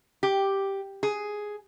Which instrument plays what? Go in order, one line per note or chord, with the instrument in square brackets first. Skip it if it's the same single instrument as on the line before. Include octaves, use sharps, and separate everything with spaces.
[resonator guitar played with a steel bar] G4
G#4